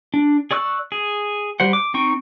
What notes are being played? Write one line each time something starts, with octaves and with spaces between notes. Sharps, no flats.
D4
G#4 D5 C#6 E6 F#6
G#4
G3 C5 F#5
D6
C4 D#4 G5 C#6